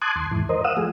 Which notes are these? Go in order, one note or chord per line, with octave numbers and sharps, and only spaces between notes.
A5 C6 D6 D#6 F#6 G#6
D#2 C6
D#2 G#2 E3
A#4 C5 D#5
F5 F#5 D#6 E6
F3 A3 G#4